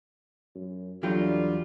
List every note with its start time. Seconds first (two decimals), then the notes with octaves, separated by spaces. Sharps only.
0.55 F#2
1.03 E2 D3 F#3 G3 F4 G5